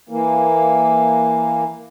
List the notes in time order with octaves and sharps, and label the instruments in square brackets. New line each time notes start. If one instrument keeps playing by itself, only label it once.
[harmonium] E3 A#3